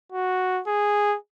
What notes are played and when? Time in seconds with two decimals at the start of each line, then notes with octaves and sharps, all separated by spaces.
0.12 F#4
0.67 G#4